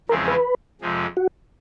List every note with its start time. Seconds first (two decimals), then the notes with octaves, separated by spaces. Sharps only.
0.09 E2 C#3 F3 G#3 C4 A#4
0.28 B4
0.81 F2 C3 F3 G#3
1.17 F#4